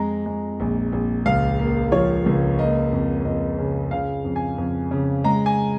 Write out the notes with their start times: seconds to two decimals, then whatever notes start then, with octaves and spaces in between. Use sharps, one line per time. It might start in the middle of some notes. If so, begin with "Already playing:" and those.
Already playing: F2 G#3 A#5
0.26 G#3
0.60 A#1
0.92 A#1
1.25 C#2 F5
1.59 A#3
1.92 F3 C#5
2.26 C#2
2.59 A#3 D#5
2.92 F2
3.25 F2 D#5
3.58 C#3
3.91 C#3 F5
4.25 F2
4.36 G#5
4.58 F2
4.91 C#3
5.24 G#3 A#5
5.46 G#5